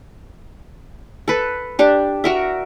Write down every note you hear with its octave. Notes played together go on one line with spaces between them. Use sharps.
A4 B4
D4 G4
F#4 A#4 E5